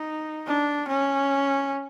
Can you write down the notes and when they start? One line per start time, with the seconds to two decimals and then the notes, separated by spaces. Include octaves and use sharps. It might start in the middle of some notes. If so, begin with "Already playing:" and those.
Already playing: D#4
0.47 D4
0.88 C#4